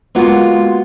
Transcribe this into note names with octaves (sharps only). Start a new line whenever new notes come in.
G#3 A#3 B3 F4 F#4